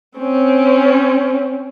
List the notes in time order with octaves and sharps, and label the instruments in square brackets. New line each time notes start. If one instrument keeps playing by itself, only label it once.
[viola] C4 C#4